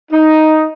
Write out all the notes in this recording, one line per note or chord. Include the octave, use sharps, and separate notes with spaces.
D#4